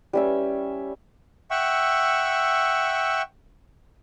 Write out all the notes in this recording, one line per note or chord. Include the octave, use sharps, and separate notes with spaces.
G3 C#4 E5
E5 F#5 G5 C#6 E6